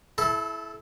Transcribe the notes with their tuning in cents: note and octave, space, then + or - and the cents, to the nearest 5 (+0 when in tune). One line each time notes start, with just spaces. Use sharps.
E4 +0 A4 -35 A5 -10